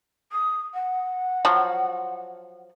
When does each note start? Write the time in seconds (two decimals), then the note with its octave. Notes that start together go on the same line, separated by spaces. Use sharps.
0.32 D#6
0.74 F#5
1.45 F3 F#3